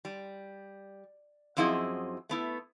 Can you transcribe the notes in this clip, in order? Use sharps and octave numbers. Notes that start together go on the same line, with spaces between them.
G3
F#2 F3 C4 E4 G#4 D#5
A3 B3 E4